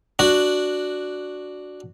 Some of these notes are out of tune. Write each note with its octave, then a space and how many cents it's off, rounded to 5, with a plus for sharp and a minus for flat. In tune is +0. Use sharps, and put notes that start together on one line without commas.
D4 +0 F#4 +0